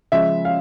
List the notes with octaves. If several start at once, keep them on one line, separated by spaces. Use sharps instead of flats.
C#3 F3 G#3 E5
F5